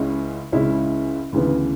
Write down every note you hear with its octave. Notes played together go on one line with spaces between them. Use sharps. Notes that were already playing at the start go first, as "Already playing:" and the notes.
Already playing: C#2 C#3 G#3 C#4 E4
C#2 C#3 G#3 C#4 E4
D2 C#3 E3 B3